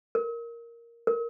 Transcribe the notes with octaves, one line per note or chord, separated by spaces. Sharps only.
A#4
A#4